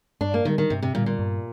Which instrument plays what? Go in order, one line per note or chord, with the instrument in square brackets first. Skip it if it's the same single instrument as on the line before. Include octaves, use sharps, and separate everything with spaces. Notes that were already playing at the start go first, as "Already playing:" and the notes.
[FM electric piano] G2 [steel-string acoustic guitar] D4
[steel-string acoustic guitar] A#3
[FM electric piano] D3 G3 [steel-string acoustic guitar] D#3
[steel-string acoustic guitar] D#3
[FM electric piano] G2 [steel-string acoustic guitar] C3
[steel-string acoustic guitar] C3
[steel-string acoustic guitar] A#2 [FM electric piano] D3 G3
[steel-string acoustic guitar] A#2
[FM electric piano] G2